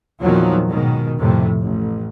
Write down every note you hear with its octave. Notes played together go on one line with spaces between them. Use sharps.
E2 A#2 D#3 F3 F#3
G#2 B2 D#3
F2 A2 C3
A1